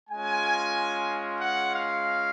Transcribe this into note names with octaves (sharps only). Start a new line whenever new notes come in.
G#3 C#4 F4 G#5
F#5
F5